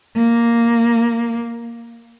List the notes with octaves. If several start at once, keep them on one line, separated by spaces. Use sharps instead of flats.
A#3